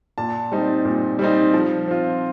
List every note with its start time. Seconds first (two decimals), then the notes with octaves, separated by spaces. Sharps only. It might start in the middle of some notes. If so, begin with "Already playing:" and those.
0.18 A#2 A5
0.52 G3 C4 D#4
0.85 A#2
1.19 G3 C4 D#4
1.54 F3
1.87 C4 F4